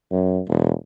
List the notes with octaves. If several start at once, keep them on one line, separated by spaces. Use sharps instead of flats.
F#2
E1